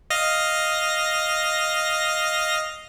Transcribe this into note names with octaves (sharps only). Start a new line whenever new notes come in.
D#5 F5 A#6